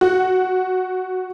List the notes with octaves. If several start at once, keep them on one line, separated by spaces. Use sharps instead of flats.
F#4